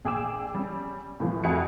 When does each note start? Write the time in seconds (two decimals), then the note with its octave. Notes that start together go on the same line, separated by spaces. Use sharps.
0.05 A#1 G#4 G5 D6 E6 E7
0.54 G3 C#4
1.20 A2 C3 E3 F3 G3
1.44 F2 F#4 E5 G#5 F#6 C#7